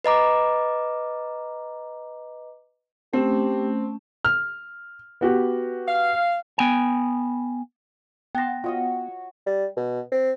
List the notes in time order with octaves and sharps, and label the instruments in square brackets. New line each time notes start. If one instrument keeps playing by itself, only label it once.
[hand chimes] B4 D#5 A#5 D6
[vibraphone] A3 C#4 [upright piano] C4 [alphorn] G4
[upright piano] F6
B3 F#4 G4
[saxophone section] F5
[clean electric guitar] B3 G5 G#5
[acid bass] B3 [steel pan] F#5 A5 C6 [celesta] G5 A#6
[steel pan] F4 D#5 [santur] F#4 C#5 F#5
[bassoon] G3
B2
C4